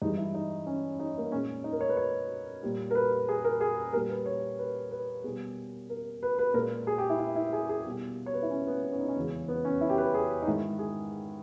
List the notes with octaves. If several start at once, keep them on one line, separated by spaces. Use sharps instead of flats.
G2 E3 G#3 D#4
E4
D#4
C#4
D#4
A#3
B3
A#2 G#3 C#4
D#4
A#4
C#5
B4
C#5
A#2 G3
A#4
B4
G#4
A#4
G#4
A#2 G3 A#4
B4
C#5
B4
B4
B2 G3 G#4
A#4
B4
B4
A#2 G#3 A#4
G#4
G4
E4
E4
E4
G#4
G#4
B2 G3
C#5
B4
E4
C#4
B3
B3
C#4
D#4
C#4
E2 C#3 E3 G#3
B3
C#4
E4
G4
B4
G#4
D#4
G#2 D#3 G#3 E4
G#4